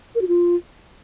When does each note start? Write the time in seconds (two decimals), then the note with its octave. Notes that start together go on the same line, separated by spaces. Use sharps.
0.15 A#4
0.21 F#4
0.28 F4